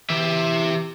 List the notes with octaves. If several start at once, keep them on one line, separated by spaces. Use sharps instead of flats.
E3 G4 E5